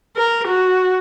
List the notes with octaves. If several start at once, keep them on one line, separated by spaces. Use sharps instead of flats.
A#4
F#4